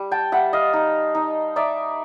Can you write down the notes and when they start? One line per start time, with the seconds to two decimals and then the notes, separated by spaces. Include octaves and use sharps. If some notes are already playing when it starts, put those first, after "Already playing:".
Already playing: G3
0.11 G5 A5
0.32 G3 E5 F#5
0.53 D#5 F5
0.73 D#4
1.15 D#4
1.56 D#4 D5 E5